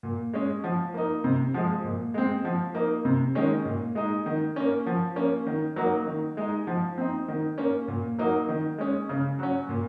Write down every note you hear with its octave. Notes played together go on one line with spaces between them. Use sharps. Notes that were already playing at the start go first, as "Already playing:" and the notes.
A#2
G#3 C#4
F3
A#3 D#4
C3
F3 G#3
A#2
G#3 C4
F3
A#3 D#4
C3
D#3 G#3 C#4
A#2
G#3 D#4
D#3
A#3 C#4
F3
A#3 C#4
D#3
F#3 A#3 D#4
D#3
G#3 D#4
F3
C4 D#4
D#3
A#3 C#4
A#2
F#3 A#3 D#4
D#3
G#3 C#4
C#3
F#3 C#4
A#2